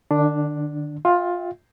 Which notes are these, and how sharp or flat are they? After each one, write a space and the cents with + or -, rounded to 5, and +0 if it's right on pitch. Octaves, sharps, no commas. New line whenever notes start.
D3 +45 D4 +0
F4 +15 E5 -20 G5 +0